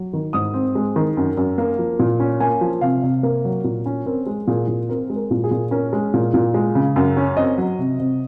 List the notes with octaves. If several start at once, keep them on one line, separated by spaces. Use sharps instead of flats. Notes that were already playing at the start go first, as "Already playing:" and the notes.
Already playing: F#3
D#3
G#2 D#6
C4
G#3
D#3
F#2
F#2
A#3
F3
A#2
C#4
A#3 G#5
F3
C3 F5
C3
A#3 A#4
F#3
A#2
C#4
C4 A#4
G#3
A#2 G#4
A#2
C4 A#4
G#3
A#4
A#2
G#4
A#2
C#4 A#4
G#3
A#2
A#2
G#3
C#3
F#2
C#4
C4 D#5
F#3
C3
C3